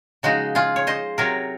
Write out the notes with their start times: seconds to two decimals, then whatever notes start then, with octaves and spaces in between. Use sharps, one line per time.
0.23 C#3 F3 G#3 D#4 F#4
0.55 F4 G#4
0.76 C#5
0.87 C5 D#5
1.18 C3 F#3 A#4 C#5